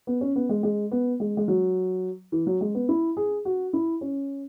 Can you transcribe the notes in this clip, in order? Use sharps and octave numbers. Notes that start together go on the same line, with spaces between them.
B3
C#4
B3
G#3
G#3
B3
G#3
G#3
F#3
E3
F#3
G#3
B3
E4
G#4
F#4
E4
C#4